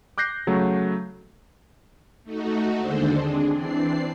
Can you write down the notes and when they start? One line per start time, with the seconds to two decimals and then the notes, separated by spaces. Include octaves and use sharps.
0.18 D6 F#6 G6 A#6 C7
0.47 C#3 F#3 A3
2.24 A3 D#4 F#4
2.78 D#2 D3 G#3 D4 A4 C5
3.14 C4 D4 G#4
3.54 E3 C4 D4 D5 C7